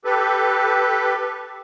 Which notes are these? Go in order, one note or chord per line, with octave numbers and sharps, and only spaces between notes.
G4 A4 B4